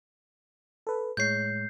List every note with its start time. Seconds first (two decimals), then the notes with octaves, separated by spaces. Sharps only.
0.87 A4 B4
1.17 A2 G#3 C#5 G6 C7